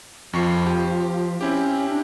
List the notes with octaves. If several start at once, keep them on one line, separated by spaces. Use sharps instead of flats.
F2 F3 C#6 C7
G4
C4 C#4 E4 G4
D4